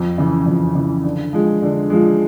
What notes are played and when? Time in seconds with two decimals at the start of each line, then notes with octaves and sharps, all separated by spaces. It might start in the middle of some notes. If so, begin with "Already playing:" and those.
Already playing: F2
0.18 C#3 E3
0.46 F2
0.75 C#3 E3
1.04 D3
1.33 F3 G#3
1.62 D3
1.90 F3 G#3